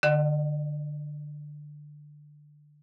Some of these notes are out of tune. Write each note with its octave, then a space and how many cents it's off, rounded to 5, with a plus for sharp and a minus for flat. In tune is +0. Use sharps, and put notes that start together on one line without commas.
D3 +15 D#5 -45 F#5 +15